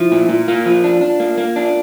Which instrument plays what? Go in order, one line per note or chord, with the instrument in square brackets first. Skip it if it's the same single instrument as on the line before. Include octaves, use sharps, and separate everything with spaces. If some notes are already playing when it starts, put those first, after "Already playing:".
Already playing: [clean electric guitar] F3 [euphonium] E4
[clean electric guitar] A#2
A#2
[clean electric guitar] A#3 [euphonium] F4
[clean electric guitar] F3
D4
D4
A#3
A#3
D4